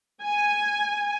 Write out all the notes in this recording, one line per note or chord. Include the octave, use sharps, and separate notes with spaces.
G#5